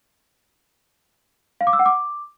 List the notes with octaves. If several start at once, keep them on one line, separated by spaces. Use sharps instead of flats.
F5
D6
E6
F#5
D6